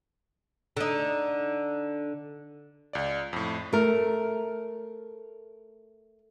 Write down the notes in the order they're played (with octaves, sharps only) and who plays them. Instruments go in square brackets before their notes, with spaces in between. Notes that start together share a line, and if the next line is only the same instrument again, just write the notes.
[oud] D3 D#4
[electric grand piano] C#2 D5
F2 A2
[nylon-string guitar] A3 A#4